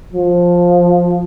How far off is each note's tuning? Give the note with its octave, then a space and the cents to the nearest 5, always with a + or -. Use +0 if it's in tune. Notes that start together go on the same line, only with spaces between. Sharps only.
F3 +10